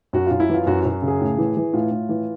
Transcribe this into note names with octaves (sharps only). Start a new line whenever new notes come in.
F#2 F#4
F#2 F4
E4
E3 F4
F#2 F#4
F#2 F#4
C#3
G#4
A2
E3
E3
A2 F4
A2
E3